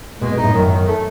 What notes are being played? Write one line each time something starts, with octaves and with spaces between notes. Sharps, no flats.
B2 G#3
B2
D#4
A2
F#2 D#3
D#3
A3